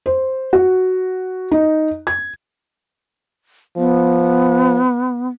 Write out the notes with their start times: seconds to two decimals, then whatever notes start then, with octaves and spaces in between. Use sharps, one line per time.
0.06 C5
0.53 F#4
1.51 D#4
2.07 G#6
3.77 F3 B3